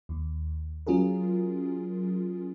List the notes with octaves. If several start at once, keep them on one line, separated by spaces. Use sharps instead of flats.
D#2
F#3 C#4 F4 G#4 A#4